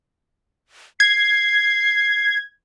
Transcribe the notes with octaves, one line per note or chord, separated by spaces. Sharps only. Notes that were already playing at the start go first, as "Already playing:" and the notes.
G#6 C7